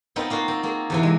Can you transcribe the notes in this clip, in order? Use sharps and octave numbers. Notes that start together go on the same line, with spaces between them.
B3 C4 D#4 F4
A#3 F4 F#4
C4
A#3 G#4
E2 C3 E3
G#3